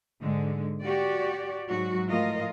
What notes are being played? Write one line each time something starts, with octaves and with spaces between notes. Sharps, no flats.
G#2 D3 G#3
F#4 G4 D5
G#2 F#3 F#4
A2 F3 F4 A#4 D#5